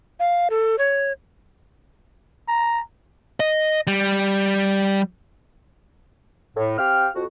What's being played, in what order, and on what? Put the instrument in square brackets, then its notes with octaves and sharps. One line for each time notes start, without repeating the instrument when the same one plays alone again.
[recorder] F5
A4
C#5
[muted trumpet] A#5
[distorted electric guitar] D#5
G3
[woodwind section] A2
C4 G4 F5 G5 F6
F2 F#4